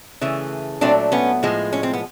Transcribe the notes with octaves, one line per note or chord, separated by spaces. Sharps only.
C#3 E3 A3
A#2 F#3 A3 C4 D4
B3 C#4
A2 F3 G#3
C#4
C4
B3